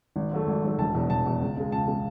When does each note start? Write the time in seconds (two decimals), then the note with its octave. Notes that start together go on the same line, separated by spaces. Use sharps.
0.16 G#1
0.31 G#2 F#3 A3
0.47 G#1
0.62 G#2 F#3 A3
0.78 E1 A5
0.94 E2 B2
1.10 E1 A5
1.26 E2 B2
1.41 C#2
1.57 C#3 G#3
1.72 C#2 A5
1.88 C#3 G#3